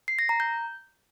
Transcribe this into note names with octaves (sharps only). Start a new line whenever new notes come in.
C7
A#6
A#5
G6